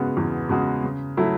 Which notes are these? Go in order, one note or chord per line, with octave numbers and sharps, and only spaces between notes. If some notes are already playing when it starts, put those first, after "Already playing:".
Already playing: C#3 G#3 B3 F#4
E2
C#3 G#3 B3 F#4
C#3
F#3 A3 E4